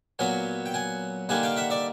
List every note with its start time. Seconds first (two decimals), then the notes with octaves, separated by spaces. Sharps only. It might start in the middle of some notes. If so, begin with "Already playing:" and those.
0.19 A#2 F#3 B3 F#5 G#5
0.66 G5
0.74 F#5 G#5
1.29 D3 G3 A#3 D#4 F#5 G#5
1.43 F5 G5
1.56 E5 F#5
1.70 D5 E5